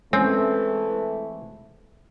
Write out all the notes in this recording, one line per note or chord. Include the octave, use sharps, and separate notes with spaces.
E3 G#3 A3 C4 C#4